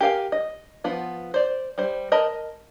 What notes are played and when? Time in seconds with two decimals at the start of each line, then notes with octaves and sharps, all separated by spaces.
0.01 G4 A#4 F5 G#5
0.32 D#5
0.84 F3 B3 F4
1.34 C5 D5
1.78 G3 C5
2.12 A#4 D#5 A5 B5